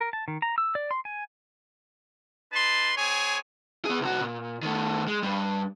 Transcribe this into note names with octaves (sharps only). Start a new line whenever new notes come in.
A#4
A5
D#3
A#5
E6
D5
C6
G#5
D#4 B4 A5 C6
C4 G#4 C#5 G#5
B3 G#4
C2 F#4
A#2
D#3 A3
G#3
G2 G3